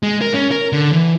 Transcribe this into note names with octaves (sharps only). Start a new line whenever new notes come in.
G#3
A#4
C#4
A#4
D3
E3